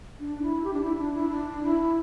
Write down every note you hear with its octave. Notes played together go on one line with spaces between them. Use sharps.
D4
E4
G4
D4
E4
D4
E4
D4
E4